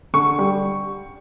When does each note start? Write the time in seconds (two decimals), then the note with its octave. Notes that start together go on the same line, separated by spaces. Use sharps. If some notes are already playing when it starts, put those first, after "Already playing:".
0.14 D3 C#6
0.38 G3